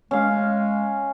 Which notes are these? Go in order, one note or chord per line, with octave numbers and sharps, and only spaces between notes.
G#3 C#4 F5